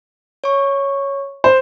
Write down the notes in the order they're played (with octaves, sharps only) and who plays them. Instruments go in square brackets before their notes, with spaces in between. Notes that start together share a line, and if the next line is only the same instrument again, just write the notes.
[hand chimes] C#5 C#6
[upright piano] C5